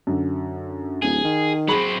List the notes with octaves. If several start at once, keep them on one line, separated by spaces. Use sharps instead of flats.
F#2 D3
D1 G#4
D#3
F#3 C4 G#4 B5